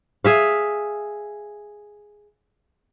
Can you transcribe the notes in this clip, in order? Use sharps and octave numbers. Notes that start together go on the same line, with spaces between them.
G#4 E5 F5